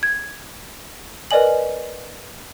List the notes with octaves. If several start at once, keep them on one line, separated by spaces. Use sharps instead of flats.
G#6
A#4 B4 D5 D#5 G#5 F#7